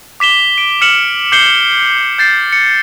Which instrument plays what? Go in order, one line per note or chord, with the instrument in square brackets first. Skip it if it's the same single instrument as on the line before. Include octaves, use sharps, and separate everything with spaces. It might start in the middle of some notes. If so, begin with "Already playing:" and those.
[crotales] D6 B6 E7 G7
D7
F6 C#7 E7 F#7
D6 G6 C7 C#7 G7
G6 A6 C7
C#7